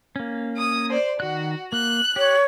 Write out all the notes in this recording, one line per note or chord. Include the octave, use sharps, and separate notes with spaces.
A#3 C#4
D#6
C5 D5
D#3 F#4 F#6
A#3 F#6
G4 C#5